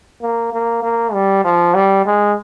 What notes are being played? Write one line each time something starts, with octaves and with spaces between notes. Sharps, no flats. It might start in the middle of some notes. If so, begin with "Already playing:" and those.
A#3
A#3
A#3
G3
F3
G3
G#3